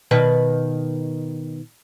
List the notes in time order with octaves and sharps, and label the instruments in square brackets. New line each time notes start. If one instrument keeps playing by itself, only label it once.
[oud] B2 D#3 B4